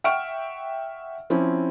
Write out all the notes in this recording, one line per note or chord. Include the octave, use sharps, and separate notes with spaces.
E5 F#5 G5 C#6 F6 D7
F3 C4 C#4 E4